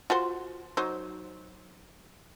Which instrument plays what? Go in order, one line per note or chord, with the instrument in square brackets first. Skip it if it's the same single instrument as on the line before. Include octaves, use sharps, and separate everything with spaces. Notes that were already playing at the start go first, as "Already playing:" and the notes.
[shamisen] F4 F#4 C5
F#3 D#4 C5